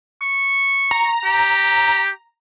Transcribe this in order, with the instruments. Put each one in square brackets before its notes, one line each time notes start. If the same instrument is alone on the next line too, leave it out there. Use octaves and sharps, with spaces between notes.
[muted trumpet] C#6
[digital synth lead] A#5
[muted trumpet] G4